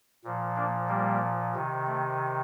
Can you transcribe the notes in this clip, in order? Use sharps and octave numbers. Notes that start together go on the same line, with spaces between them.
A#2 F3
A#3 D4
G3 A#3
C3 D#3
A3